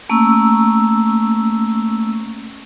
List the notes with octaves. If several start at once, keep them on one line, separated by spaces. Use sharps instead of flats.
A3 A#3 C#4 C#6 E6